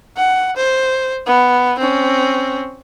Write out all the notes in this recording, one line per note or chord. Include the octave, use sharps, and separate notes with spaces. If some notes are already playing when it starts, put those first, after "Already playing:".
F#5
C5
B3
C4 C#4